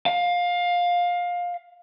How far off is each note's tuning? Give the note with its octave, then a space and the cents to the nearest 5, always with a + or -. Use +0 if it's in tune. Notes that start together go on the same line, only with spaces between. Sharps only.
F5 +20